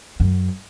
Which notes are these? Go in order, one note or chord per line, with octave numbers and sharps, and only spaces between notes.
F#2